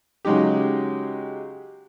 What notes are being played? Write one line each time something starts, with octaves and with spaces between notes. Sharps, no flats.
C#3 F#3 G#3 D#4 G4